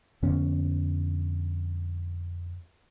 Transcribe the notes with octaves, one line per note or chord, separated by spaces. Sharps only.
F2 D3 B3 C#4